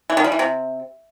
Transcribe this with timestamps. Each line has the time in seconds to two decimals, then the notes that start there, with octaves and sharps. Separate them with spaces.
0.10 E3
0.17 D#3
0.24 G3
0.32 E3
0.39 C3